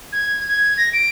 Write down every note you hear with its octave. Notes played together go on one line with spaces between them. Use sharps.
G#6
G#6
A#6
D7